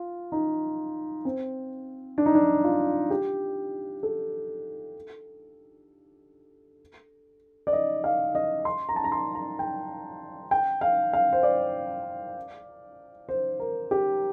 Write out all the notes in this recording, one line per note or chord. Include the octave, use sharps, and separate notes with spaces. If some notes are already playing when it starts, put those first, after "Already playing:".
Already playing: F4
D#4
C4
D4
D#4
D4
F4
G4
A4
D5
D#5
F5
D#5
C6
A#5
A5
A#5
C6
A#5
G5
G5
F5
F5
C5
D5
C5
A#4
G4